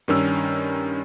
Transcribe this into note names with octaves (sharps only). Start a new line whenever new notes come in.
G2 D#3 C#4 E6